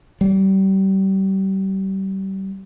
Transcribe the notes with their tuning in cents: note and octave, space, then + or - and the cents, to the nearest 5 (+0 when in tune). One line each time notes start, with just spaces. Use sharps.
G3 -30